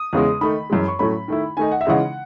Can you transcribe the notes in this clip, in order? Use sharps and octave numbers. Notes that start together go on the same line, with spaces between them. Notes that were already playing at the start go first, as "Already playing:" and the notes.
Already playing: D#6
E2 C#3 G#3
D#3 A3 D#4 B5
F#2 E3 G#3
C#6
A2 F#3 A3 C#4 B5
D#3 A3 E4
D#3 A3 D#4 G#5
F#5
E5
C#3 E3 G#3 D#4 F#5